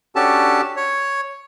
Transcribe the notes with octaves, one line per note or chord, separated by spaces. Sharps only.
C#4 D4 F#4 G4 A4 A5
C#5